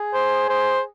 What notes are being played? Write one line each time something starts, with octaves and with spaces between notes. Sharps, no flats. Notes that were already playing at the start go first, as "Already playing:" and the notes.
Already playing: G#4
C5
C5